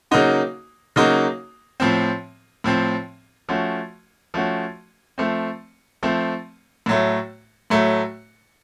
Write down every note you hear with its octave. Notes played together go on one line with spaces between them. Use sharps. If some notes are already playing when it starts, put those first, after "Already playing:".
C#3 F#3 A#3 D#4 F#4
C#3 F#3 A#3 D#4 F#4
A2 F3 C4
A2 F3 C4
F3 A3 C#4 F#4
F3 A3 C#4 F#4
F3 A3 C4
F3 A3 C4
A2 F#3 A3
A2 F#3 A3